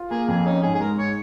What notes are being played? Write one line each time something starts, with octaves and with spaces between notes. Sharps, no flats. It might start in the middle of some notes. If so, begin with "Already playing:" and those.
Already playing: F4
A#3 G#4
F2 G#4
C#4 D#4
G#2 G#4
G#4
G#3 A#4
G#2 C#5